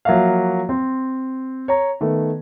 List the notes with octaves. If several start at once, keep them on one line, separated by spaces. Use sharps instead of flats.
F3 F#3 A#3 F#4 E5 F5
C4
C#5 A#5
D#3 A3 B3